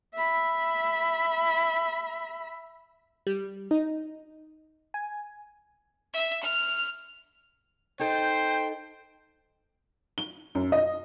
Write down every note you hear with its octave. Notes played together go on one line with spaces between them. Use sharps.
E5 B5
G3
D#4
G#5
E5
F6
D#4 A4 C5 G5
G7
F#2
D#5